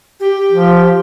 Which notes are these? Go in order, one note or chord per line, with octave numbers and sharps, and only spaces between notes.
G4
F3